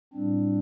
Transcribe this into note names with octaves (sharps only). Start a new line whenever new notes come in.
A2 G3 C4 D4